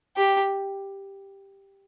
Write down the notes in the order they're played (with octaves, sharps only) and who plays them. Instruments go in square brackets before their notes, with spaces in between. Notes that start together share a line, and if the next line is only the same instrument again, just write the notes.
[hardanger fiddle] G4